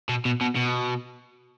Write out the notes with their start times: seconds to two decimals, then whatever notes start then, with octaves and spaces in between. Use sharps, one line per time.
0.09 B2
0.25 B2
0.41 B2
0.56 B2